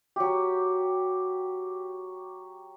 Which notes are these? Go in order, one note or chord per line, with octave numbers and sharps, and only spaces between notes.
F#3 G4